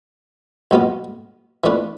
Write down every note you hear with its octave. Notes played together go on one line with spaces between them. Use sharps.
B1 B2 B3 F4
E3 A3 D4 F4 B4